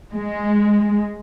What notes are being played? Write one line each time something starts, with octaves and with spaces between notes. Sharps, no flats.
G#3